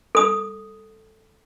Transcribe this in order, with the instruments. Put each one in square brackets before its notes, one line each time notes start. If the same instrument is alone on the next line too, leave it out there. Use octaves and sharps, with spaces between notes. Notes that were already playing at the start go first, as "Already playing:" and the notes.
[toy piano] A4 D#6